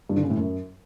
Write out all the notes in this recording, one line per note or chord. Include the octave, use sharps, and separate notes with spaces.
G2
D3
C#3
A2
F#2